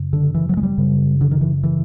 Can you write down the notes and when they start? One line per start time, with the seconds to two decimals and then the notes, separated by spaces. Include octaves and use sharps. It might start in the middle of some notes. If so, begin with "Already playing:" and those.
Already playing: F#2 C#3
0.13 D3
0.34 E3
0.49 F#3
0.57 G#3
0.63 G3
0.77 F#2 C#3
1.21 D3
1.31 D#3
1.41 E3
1.63 E3